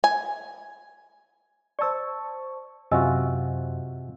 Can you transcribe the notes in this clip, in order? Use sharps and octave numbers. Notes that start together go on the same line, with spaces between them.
G#5
C5 D5 A5 C#6 E6
F#2 C3 F4 F#4 D#5 G#5 E6